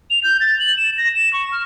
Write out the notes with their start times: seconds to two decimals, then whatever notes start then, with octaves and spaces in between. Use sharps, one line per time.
0.10 F7
0.24 G6
0.41 A6
0.59 F#7
0.77 E7
0.98 A#6
1.15 E7
1.33 C#6
1.52 F6